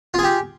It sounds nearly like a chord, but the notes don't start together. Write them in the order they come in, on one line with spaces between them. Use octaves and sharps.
F4 G#4 G4